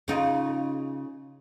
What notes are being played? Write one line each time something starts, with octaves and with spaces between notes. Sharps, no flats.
C#3 D#4 F4